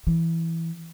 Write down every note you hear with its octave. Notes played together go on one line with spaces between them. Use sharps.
E3